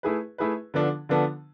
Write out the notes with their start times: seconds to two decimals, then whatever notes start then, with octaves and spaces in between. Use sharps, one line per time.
0.03 A3 E4 G#4 B4
0.38 A3 E4 G#4 B4
0.74 D3 F3 B3 D4 A4
1.09 D3 F3 B3 D4 A4